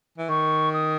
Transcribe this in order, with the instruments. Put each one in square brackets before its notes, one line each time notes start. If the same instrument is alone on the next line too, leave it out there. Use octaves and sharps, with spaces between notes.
[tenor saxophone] E3
[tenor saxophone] D#3 [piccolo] C#6
[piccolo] D#6